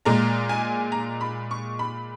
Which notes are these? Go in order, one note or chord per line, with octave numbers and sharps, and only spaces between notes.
A#2 G#3 A#5
G#5
A#5
B5
C#6
B5